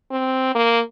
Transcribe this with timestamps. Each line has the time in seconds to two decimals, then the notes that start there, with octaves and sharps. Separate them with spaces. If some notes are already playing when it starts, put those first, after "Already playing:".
0.12 C4
0.55 A#3